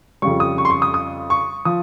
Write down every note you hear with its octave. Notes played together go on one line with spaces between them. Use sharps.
F2 C#3 G3 C#6
D#6
C#6
C6
C#6
D#6
D#6
C#6
F3 D#6